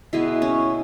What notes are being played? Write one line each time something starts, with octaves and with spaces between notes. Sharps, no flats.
B2 G#3 B3 E4
C#4